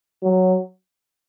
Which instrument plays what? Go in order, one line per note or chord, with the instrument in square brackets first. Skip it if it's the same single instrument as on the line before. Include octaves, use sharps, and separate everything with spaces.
[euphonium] F#3